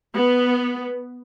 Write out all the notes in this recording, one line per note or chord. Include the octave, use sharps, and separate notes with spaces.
B3